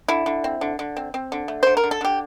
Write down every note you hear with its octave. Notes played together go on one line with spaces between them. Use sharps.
D3 E4
D3
C4
D3
D3
C4
C4
D3
A3
D3 C5
A#4
D3
A4
D3 G4